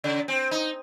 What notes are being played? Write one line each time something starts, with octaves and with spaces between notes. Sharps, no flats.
C#3
C4
D#4